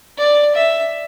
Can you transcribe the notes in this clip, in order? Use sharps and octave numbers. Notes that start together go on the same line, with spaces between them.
D5
E5